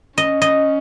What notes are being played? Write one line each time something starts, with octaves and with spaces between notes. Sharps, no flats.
C#4 D#5
D#5